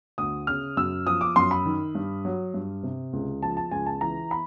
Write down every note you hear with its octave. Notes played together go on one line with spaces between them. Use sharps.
D2 D#6
C#3 F6
F#2 E6
F3 D#6
D6
F#2 C6
B5
D#3
G2
F#3
G2
C3
C#2
F3 A5
A5
C#2 G#5
A5
E3 A#5
B5